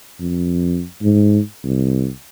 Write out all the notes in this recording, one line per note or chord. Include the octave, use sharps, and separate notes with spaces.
F2
G#2
C2